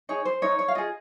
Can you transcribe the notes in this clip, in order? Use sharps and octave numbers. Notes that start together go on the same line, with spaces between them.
D#4 G#4 C#5
C5
D#4 A#4 C#5
C#5
F5
F4 G#4 D#5